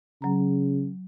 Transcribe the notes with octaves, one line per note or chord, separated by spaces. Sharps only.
C#3 F#3 A#5